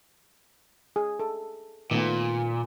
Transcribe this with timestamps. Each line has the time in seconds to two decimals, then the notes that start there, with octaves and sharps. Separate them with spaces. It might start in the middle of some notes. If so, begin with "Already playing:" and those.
0.96 G#4
1.19 A4
1.91 A#2 D#3 A3 B3